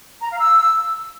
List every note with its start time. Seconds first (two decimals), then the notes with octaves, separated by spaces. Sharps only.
0.22 A#5
0.31 F5
0.40 E6